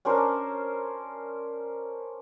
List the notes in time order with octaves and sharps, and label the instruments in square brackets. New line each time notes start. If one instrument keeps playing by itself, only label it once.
[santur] C#4 D4 A#4 C5